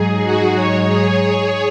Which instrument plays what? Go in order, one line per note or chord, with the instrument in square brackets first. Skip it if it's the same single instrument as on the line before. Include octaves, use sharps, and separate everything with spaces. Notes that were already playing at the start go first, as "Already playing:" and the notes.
Already playing: [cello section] G#2 F#3 D#4 [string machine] G#4
[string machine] F#4
C#5
G#4